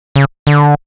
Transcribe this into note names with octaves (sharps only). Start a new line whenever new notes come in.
C#3
D3